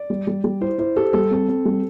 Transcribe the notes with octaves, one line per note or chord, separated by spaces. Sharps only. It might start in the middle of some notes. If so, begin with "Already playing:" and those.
Already playing: D5
G3
G3
G3
E4 C5
E4 C5
G4 A4
G3 A4
C4 A4
C4
G3